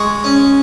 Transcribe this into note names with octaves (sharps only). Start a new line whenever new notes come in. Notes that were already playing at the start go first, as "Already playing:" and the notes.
Already playing: G#3 C#6
C#4